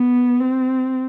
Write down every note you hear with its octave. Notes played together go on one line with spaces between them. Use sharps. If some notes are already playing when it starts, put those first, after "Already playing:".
Already playing: B3
C4